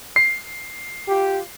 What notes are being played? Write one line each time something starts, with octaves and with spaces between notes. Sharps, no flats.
C7
F4 G4